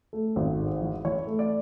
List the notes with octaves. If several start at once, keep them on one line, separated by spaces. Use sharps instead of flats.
A3
G#1
G#2
E3
E3 C#5
A3
D5